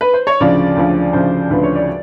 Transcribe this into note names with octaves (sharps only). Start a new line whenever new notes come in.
B4
C5
C#5
D2 C#3 F3 D5
D2 C#3 F3
D2 C#3 F3 C5
D2 C#3 F3 B4
C#5
D5